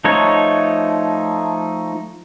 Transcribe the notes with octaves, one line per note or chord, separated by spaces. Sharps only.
F3 A3 D#4 C#5